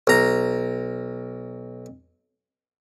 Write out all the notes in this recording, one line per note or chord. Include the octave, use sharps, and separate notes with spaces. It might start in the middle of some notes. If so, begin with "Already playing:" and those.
B1 A#5